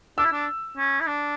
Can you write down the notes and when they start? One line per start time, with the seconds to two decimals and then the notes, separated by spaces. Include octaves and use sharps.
0.18 D4 E6
0.24 E4
0.32 D4
0.77 C#4
1.00 E4
1.06 D4